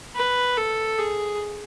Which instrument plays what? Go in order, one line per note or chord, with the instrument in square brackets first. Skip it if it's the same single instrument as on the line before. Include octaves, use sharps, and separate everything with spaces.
[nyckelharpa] B4
A4
G#4